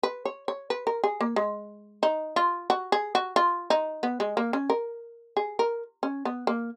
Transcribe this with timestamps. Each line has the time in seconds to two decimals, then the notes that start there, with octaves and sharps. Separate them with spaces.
0.03 B4
0.25 C#5
0.48 C#5
0.70 B4
0.87 A#4
1.04 G#4
1.21 A#3
1.36 G#3
2.03 D#4
2.36 F4
2.70 F#4
2.92 G#4
3.15 F#4
3.36 F4
3.70 D#4
4.03 B3
4.20 G#3
4.37 A#3
4.53 C#4
4.70 A#4
5.37 G#4
5.59 A#4
6.03 C#4
6.25 B3
6.47 A#3